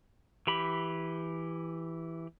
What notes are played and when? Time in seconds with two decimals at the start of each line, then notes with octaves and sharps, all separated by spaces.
0.47 E3 G4 B5